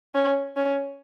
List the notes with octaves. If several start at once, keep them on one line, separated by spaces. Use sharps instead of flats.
C#4
C#4